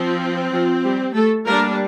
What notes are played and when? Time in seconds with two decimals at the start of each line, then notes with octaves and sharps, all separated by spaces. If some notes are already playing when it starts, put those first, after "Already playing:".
Already playing: F3 C4
0.53 F3 F4
0.84 G3 G4
1.15 A3 A4
1.46 G3 A#3 D4 A#4